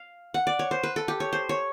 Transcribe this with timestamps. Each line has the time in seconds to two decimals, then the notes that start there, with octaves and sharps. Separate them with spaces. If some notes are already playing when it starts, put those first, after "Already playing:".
Already playing: F5
0.34 F#5
0.47 D5
0.59 C#5
0.71 C5
0.83 B4
0.96 A4
1.08 G4
1.20 C#5
1.33 C5
1.49 C#5